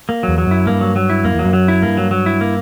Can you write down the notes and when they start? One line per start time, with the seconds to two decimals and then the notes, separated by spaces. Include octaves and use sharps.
0.09 A#3
0.23 F#3
0.28 E2
0.38 F#3
0.47 F#2 E4
0.66 G2 A#3
0.81 F#3
0.96 F#3
1.10 E4
1.25 F#2 A#3
1.34 E2 F#3
1.45 F#2
1.53 F#3
1.68 E4
1.82 G2 A#3
1.97 F#3
2.11 F#3
2.26 E4
2.41 A#3